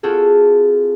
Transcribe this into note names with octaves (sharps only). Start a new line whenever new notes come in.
C4 F4 F#4 G#4 A4